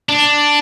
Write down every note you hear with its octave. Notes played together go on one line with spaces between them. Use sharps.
D4